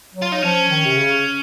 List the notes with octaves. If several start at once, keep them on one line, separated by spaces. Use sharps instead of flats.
F#3
F4
D#4
F3 C#4
D#3
C3
C#3